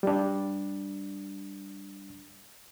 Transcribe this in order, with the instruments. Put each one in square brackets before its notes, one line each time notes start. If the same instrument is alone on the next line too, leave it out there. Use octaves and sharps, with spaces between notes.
[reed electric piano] G3 D4